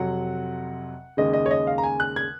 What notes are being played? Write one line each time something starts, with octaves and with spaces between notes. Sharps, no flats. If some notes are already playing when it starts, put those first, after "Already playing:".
Already playing: F2 C3 F#3 F#5
D#2 C#3 G#3 D#5
D#5
C#5
D#5
F5
A#5
G#5
F#6
G#6